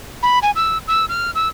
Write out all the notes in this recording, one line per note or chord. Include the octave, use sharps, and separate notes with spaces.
B5
G#5
E6
E6
F6
E6